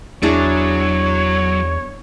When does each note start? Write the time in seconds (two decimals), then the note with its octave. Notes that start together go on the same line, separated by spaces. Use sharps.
0.23 E2 F#3 D4 E4 G#4 C#5